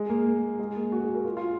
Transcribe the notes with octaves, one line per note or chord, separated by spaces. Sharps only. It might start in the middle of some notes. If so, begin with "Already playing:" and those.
Already playing: G#3
A#3
G#3
A#3
F#4
G#4
A#4
F4
F4